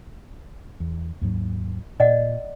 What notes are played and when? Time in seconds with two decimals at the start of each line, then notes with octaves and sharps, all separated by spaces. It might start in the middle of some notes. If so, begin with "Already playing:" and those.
0.80 E2
1.21 D#2 G#2 F#3
2.00 A#2 D5 D#5 F#5